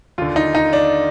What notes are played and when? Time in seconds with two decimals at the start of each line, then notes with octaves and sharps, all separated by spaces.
0.18 D#2 D3 F4
0.36 D#4
0.55 D#4
0.73 D4